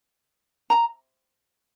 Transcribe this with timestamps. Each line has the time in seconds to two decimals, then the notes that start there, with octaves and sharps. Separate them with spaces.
0.70 A#5